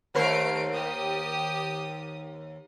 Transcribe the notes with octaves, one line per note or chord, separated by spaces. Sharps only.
D#2 A3 A#4 C5 C7 D7
G4 D#6